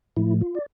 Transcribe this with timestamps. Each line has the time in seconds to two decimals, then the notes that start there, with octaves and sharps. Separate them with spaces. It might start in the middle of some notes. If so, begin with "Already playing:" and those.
0.17 A2 F3 A3 E4
0.41 F4
0.55 D5